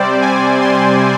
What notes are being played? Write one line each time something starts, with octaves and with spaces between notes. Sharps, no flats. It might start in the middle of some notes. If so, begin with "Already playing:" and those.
Already playing: C3 G3 C4 C5 D5
G#5
C6